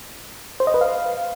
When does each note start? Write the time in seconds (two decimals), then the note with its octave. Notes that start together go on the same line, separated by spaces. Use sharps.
0.60 C5
0.67 D#5
0.74 B4
0.81 F5